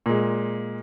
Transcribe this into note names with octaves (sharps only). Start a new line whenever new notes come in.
A#2 G#3